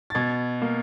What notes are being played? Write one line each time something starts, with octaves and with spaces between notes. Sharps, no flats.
A6
B2 G#6
A#3